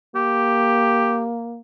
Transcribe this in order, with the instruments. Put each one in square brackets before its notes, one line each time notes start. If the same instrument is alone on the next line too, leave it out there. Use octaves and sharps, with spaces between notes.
[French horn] A#3 [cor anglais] G4